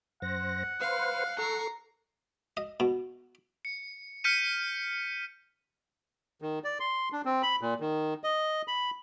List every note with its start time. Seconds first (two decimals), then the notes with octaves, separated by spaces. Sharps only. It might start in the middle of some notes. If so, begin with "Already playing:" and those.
0.22 F#2 C5 F#5 A#6
0.80 B4 C5 F5
1.38 A4 A#5 C#6 C7
2.57 D#5
2.80 B2
3.65 C#7
4.24 F6 G6 B6 C#7 D#7
6.42 D#3
6.64 D5
6.80 C6
7.12 D4
7.25 C4
7.43 B5
7.61 A#2
7.80 D#3
8.24 D#5
8.68 B5